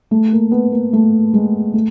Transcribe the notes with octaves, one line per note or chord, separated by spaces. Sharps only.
A3
A#3
B3
A#3
A3
G#3
A3